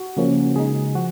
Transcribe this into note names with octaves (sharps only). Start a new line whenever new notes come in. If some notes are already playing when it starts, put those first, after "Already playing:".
Already playing: F#4
C#3 F3 A#3 C#4
C#3 G#3 D#4 G#4
F3 F#4